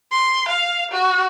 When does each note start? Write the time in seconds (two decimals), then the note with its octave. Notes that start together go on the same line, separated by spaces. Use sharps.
0.11 C6
0.49 F5
0.92 F#4